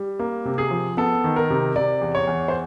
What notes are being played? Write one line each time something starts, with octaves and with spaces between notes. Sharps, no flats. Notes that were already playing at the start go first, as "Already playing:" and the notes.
Already playing: G3
A#3
C3
G#4
F3
B3 A4
D#3
A#4
C3
C3 D5
E2
C#5
E2
C5